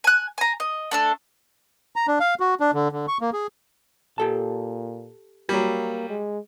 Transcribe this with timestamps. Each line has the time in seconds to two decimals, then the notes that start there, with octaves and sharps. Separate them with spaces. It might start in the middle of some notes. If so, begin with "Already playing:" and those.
0.04 G#5 F#6
0.38 G#5 A#5
0.60 D#5
0.91 A3 D4 A4
1.96 A#5
2.07 D4
2.20 F5
2.40 F#4
2.60 D4
2.74 D3
2.92 D3
3.08 C#6
3.21 A#3
3.33 G#4
4.18 A#2 G4 A4 A5
5.49 F#3 G3 A#3
6.09 G#3